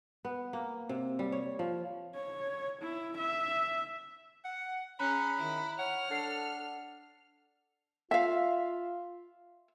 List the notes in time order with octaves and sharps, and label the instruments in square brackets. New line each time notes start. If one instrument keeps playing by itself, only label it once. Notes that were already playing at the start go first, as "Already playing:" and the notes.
[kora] B3
A#3
C3
G3
C#5
F3
[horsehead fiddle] C#5
E4
E5
[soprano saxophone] F#5
[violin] C#4 G#4 [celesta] A#5 F#6 [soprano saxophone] B5
[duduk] D#3 [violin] E4
[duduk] C#5 [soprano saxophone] F#5 [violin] F6
[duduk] D4 [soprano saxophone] A4 [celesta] F#5 C7
[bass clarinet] F4 [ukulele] E5 F5